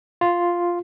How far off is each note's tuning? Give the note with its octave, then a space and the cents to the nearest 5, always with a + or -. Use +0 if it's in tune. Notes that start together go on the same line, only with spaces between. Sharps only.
F4 +0